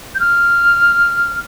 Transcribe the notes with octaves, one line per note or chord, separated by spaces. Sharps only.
G6
F6